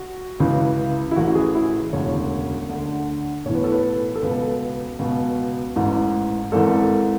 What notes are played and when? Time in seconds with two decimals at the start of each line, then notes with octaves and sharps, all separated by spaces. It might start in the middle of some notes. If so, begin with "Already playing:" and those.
Already playing: F#4
0.40 C#2 C#3 E3
1.11 E4
1.16 A1 A2 E3 F#4
1.35 G#4
1.55 E4
1.93 E1 D2 C#3 C#5
2.69 D2 D3
3.45 B1 A2 E3 C#5
3.55 B4
3.64 A4
3.72 B4
4.15 A4
4.22 C#2 B2 B4
4.99 C#2 B2
5.76 A1 G#2 E3
6.52 G#1 G#2 E3 A4